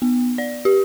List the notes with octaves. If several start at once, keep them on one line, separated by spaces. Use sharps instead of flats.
B3
D5
G4